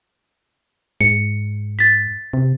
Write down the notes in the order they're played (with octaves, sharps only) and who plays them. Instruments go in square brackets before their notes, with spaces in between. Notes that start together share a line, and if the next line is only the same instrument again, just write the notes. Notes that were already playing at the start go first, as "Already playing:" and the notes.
[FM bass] G#2 [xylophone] C#7
[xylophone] A6 B6
[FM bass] C3